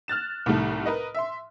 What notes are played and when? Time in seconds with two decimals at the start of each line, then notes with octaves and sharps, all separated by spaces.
0.08 F6 F#6 A6 E7
0.46 C2 A2 D#3 G3 A3
0.86 A#4 B4 D#5
1.14 E5 C6